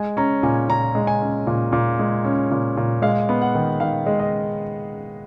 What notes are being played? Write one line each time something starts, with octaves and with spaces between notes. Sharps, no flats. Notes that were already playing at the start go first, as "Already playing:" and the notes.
Already playing: G#3 G#5
C#4 A#5
A#2 G#5
A#2 A#5
G#3
G#5
C#4
A#2
A#2
G#3
C#4
A#2
A#2
G#3 F5
B3
F#5
D#3
D#3 F5
G#3
D#5